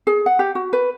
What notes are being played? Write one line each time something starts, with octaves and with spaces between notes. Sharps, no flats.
G#4
F#5
G4
F#4
B4